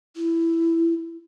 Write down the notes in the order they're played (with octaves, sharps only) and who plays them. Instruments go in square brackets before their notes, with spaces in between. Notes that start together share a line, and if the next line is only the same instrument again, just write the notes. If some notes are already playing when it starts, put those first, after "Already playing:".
[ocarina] E4